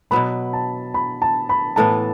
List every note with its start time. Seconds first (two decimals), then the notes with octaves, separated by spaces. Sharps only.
0.11 B2 F#3 B3 B5
0.53 A5
0.94 B5
1.22 A5
1.49 B5
1.76 A2 E3 B3 A5